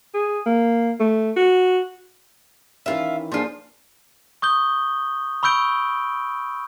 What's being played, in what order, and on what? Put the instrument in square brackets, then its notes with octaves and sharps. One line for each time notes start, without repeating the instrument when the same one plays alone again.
[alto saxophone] G#4
A#3
A3
F#4
[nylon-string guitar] D#3 E3 C#4 [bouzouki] F4 E5
[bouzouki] F3 F4 [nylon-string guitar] A#3 D4 G#4
[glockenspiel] C#6 D#6 G6 G7
B5 C#6 E6 G6 D7 G7